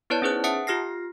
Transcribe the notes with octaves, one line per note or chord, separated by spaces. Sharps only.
B3 E4 B4 C#5 D5 A5
C#4 D#4 G#4 B4 C5 F#6
E5 F#5 A5 D#6 C#7
F4 G4 F6 A#6 C7